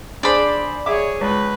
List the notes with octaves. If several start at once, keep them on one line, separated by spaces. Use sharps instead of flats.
D4 G#4 C5 D5 B5
G#4 C#5 E5 D6
C#2 B4